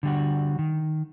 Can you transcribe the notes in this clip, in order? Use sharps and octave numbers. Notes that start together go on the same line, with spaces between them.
D3 G3 F#4
D#3